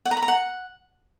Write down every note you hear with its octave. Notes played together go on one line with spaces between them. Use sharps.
F#5
A#5
B5
A#5
F#5